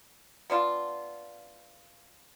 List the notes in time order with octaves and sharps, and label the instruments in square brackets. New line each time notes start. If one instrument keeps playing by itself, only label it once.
[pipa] B3 D4 F4